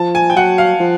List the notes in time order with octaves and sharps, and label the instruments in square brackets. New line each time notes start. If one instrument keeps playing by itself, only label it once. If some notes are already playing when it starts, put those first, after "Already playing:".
Already playing: [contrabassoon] F3 [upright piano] A5
[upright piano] G#5
G5
[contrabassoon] F#3 [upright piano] F#5
[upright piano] F5
[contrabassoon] F3